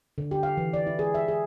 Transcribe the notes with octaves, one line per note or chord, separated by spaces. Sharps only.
D3
G4
F5
E3
D5
E4
G#4
E5
G#4